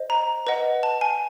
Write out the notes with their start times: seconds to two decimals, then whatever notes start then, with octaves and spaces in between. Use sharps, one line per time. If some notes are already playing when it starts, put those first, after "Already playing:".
Already playing: C5 D#5
0.10 A#5
0.47 B4 D#5 F#5
0.83 A5
1.01 G#5